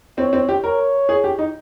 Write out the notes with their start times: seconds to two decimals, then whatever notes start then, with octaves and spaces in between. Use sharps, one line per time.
0.18 C4 C#5
0.33 C4
0.49 G4
0.64 A#4 C#5
1.09 G#4
1.24 G4
1.39 D#4